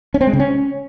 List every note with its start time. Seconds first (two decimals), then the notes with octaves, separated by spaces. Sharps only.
0.14 C#4
0.21 C4
0.27 G#3
0.33 C#3
0.40 C#4